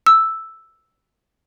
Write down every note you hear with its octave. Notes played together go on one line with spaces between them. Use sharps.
E6